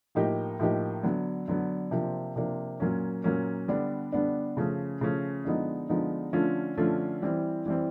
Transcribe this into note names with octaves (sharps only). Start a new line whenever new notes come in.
A2 F3 A#3 D#4 G4
A2 F3 A#3 D#4 G4
D3 F#3 B3
D3 F#3 B3
C3 F3 A#3 D4
C3 F3 A#3 D4
A#2 F#3 A#3 C#4
A#2 F#3 A#3 C#4
D3 G3 B3 D4
D3 G3 B3 D4
C#3 F3 A3 C#4
C#3 F3 A3 C#4
D3 F3 G#3 B3 D#4
D3 F3 G#3 B3 D#4
D3 F3 A3 C#4 F4
D3 F3 A3 C#4 F4
E3 G3 C4
E3 G3 C4